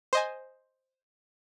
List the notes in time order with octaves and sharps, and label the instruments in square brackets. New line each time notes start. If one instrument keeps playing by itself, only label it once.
[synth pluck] C5 D#5 G#5